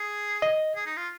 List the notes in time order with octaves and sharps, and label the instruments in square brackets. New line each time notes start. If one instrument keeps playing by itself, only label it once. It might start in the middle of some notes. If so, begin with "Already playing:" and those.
Already playing: [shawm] G#4
[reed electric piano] D#5
[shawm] G#4
D#4
F4